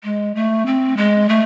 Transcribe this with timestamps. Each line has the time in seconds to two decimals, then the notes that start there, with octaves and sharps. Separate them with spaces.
0.04 G#3
0.35 A3
0.66 C4
0.97 G#3
1.29 A3